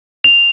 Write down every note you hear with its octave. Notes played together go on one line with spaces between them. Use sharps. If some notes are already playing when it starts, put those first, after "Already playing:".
F7